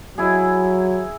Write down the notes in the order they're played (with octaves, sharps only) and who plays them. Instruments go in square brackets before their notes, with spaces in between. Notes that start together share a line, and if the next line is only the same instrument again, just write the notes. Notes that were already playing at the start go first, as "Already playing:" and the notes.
[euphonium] F#3 [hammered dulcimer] E4 G#4